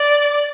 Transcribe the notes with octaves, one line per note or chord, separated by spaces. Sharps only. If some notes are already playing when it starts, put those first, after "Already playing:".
Already playing: D5